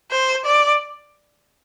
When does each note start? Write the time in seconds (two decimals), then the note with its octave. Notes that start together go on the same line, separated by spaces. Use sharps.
0.11 C5
0.45 D5